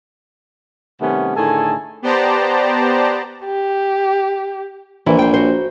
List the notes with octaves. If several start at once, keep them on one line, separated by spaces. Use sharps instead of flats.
C3 D#3 G3 A3 B3 C#4
A2 D3 D#3 G#4 A4 G#5
B3 G4 C5 D5 A5 A#5
G4
A#1 E3
C5 G5
F#4 C5